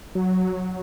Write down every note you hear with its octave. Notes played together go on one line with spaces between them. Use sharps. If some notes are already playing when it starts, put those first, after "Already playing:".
F#3